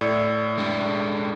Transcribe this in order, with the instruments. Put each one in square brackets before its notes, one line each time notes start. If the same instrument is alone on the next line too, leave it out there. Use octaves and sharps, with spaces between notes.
[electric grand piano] A2 [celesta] D5 E6 C#7
[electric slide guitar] G#3 D4 G4